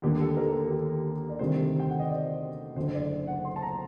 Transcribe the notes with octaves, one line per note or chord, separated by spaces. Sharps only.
D#2 D3 G3 A#3 G4
A4
A#4
A4
G4
D5
D2 C3 D#3 G3 C5
G5
F#5
D#5
D5
F#1 F#2 D3 C5
D5
F#5
C6
A5
A#5